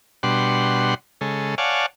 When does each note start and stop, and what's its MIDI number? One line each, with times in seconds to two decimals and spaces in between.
0.23 0.94 47
0.23 0.94 55
0.23 0.94 62
0.23 0.94 78
0.23 0.94 84
1.21 1.55 49
1.21 1.55 56
1.21 1.55 69
1.58 1.86 73
1.58 1.86 74
1.58 1.86 77
1.58 1.86 78
1.58 1.86 80
1.58 1.86 81